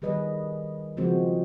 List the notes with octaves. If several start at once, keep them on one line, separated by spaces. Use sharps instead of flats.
D#3 G3 G#4 B4 D#5
C#3 F3 G#3 C4 F#4 C5